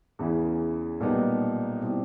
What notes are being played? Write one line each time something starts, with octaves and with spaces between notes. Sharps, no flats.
E2 C#3 E3
B1 A#2 G3 B3 D#4
B2 G3 C4 E4